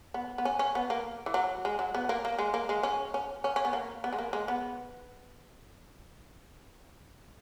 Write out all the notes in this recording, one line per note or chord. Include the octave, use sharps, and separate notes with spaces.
B3
B3
C#4
C#4
B3
A#3
E3
F#3
G#3
F#3
B3
A#3
A#3
G#3
A#3
G#3
C#4
C#4
C#4
C#4
B3
A#3
B3
G#3
A#3
G#3
B3